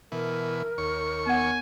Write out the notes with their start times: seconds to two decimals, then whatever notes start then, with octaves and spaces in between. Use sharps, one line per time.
0.12 B2 E3 A#4
0.78 D#2 C#5 C#6
1.26 B3 F#5 G#5